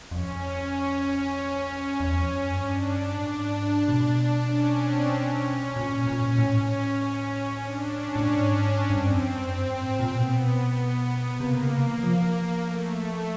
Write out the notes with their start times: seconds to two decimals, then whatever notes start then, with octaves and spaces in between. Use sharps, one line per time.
0.11 F2 C#4
2.00 E2
2.15 F2
2.31 F#2
2.47 G2
2.63 D4
3.15 A2
3.25 G#2 D4
3.88 B2
4.50 C#4
4.82 C4
5.14 C#4
5.76 A#2
6.07 A#2
6.38 A2
7.64 D4
7.95 C#4
8.16 A2
8.26 G#2
8.90 G2 C4
9.10 F2
9.31 F#2
9.52 G2
9.68 G#2
9.83 A#2
9.99 A#2
10.15 B2 B3
11.40 C3 A#3
11.56 C#3
11.72 C3
11.87 E3
12.03 F3
12.65 A3